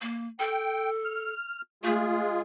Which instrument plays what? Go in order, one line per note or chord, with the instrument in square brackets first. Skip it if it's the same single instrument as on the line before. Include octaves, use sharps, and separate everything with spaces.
[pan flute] A#3
[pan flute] A4 [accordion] G5
[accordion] F6
[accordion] G#3 F4 G#4 [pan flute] A3